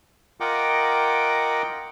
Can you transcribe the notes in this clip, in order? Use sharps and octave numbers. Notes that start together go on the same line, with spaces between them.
F4 A#4 D#5 F#5 G5 D6